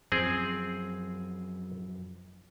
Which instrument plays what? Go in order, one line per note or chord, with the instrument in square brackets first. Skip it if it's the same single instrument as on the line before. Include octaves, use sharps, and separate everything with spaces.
[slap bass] F#2 F3 [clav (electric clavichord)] C4 G#4